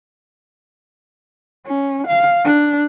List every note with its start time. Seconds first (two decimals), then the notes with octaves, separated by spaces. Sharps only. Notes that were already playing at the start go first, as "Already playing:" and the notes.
1.66 C#4
2.07 F5
2.45 D4